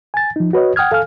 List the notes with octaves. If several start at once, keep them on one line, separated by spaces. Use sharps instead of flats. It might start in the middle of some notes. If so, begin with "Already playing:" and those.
G#5 A6
F3 D#4
F#4 B4 C#5 D#5
F#5 G5 D#6 F6 G#6
A4 F5 G#5 F6